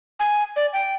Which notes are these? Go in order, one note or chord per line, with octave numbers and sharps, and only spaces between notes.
G#5
D5
G5